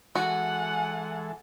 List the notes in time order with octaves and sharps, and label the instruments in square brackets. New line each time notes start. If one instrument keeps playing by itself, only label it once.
[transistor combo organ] E3 G#3 A4 [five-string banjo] F#4 [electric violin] F#5 [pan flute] G#5